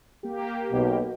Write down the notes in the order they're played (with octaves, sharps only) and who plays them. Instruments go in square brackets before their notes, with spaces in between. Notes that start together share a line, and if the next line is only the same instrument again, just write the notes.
[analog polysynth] A#3 G4
[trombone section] B1 B2